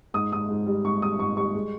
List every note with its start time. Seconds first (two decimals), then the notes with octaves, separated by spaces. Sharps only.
0.14 G#2 D#6
0.32 G#2 D#6
0.48 G#2
0.66 G3
0.84 G#2 C#6
1.02 G3 D#6
1.19 G#2 C#6
1.37 G3 C#6
1.55 G#3